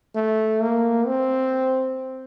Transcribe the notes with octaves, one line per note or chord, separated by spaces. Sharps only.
A3
A#3
C4